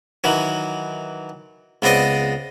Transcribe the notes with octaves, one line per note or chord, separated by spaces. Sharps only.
D#3 E3 F#3
C#2 B3 C4 D5 D#5